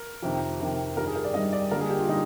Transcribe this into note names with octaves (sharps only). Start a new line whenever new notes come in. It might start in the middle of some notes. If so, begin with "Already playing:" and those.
Already playing: A#4
F2 C3 D#3
F2 C3 D#3
G2 D#3 G3 A#4
G#4
A#4
D5
G2 D#3 G3 D#5
D5
D3 G3 A#3 A#4
G#4
G4
F4
D3 G3 D#4